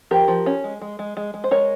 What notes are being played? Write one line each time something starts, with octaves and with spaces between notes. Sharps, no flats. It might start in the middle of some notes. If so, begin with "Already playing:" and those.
F3 G4 A#4
F3
C#4
G#3
G#3
G#3
G#3
G#3
C5
G#3 A#4 C#5